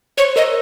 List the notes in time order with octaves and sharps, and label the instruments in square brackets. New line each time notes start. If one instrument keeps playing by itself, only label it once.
[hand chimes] C5 [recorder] C#5
[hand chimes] A#4 [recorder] D#5